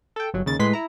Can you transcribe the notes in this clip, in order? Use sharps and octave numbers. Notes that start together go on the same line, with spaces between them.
A4 G5
G1 F#3
D#2 C#3 A6
A2 G#3 B4 C6 B6
E4 A#5